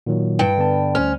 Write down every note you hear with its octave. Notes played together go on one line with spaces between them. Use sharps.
A#2 D#3 F#3
G2 G5
D3 B3 A5
D2 C#4 C5 F6